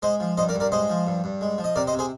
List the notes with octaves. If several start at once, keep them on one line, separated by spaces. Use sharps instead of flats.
G#3 C5 D#5
F3
G2 C5 D#5
A#4 D5
G2
A#4 D5
G#3 C5 D#5
F3
G2
G2
G#3
F3
D#5
C3 A#4 D5
C5 D#5
C3
G#4 C5